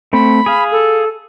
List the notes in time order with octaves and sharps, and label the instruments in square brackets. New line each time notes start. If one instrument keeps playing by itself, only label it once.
[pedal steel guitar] A3 C4 [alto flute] B5
[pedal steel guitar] G#4 F5
[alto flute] A4